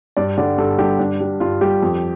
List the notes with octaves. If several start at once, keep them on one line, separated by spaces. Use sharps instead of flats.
G2 D5
D3 G3 D5
G2 A4
D3 G3 G4
G2 D4
G3
G2 F4
G3 G4
F2